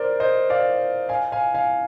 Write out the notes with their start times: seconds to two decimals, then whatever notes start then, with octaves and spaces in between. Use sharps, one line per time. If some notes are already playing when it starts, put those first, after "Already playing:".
Already playing: A#4 C5 D5
0.20 C5 D#5
0.50 D5 F5
1.09 F5 G#5
1.32 F5 G#5
1.54 F5 G#5